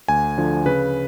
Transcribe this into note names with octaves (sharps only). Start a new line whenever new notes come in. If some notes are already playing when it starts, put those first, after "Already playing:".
D2 G#5
D3 F3
C#3 B4